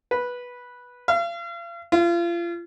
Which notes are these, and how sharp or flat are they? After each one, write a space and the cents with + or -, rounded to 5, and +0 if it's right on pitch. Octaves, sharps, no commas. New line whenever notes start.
B4 -10
F5 -40
F4 -35